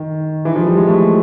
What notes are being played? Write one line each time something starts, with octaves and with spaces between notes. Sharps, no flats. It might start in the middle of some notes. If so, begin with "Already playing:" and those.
Already playing: D#3
E3
F3
G3
G#3
A3